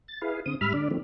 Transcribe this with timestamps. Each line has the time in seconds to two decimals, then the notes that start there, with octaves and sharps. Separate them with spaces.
0.08 A6
0.22 E4 G#4 B4 F5
0.46 D3 C4 D#6
0.61 G#2 G3 E5 B5 F6
0.74 D3 D4 D5
0.91 D#3 F3 A3 C4